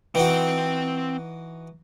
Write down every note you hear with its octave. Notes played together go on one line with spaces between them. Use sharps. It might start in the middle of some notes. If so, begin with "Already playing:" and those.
E3 C4 D#4 F#4 G5